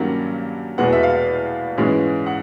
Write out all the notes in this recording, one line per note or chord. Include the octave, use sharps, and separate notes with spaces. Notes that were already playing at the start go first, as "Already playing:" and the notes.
Already playing: G2 D#3 F#3 A#3 C#4 F#5
E2 B2 G#3 B3 F#5
E5
F5
G#2 E3 G#3 C#4
F#5